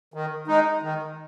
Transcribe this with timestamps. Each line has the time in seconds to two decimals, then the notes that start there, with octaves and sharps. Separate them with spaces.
0.14 D#3
0.48 G#3 D#4
0.82 D#3